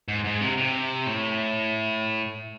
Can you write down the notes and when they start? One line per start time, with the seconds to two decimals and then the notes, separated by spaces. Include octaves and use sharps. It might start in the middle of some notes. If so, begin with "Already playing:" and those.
0.08 G#2
0.24 G#2
0.41 C3
0.58 C3
1.06 A2